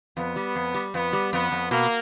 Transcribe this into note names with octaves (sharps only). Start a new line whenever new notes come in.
F2 B3
G3
F2
G3
F2 B3
G3
F2 B3
F2
B2 A#3